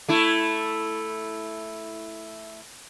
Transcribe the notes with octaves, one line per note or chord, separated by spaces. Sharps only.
A3 E4